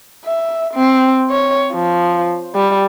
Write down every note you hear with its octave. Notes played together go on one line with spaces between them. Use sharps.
E5
C4
C#5
F3
G3